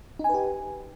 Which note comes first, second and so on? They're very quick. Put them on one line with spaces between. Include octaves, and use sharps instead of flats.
D#4 G#5 B4 G4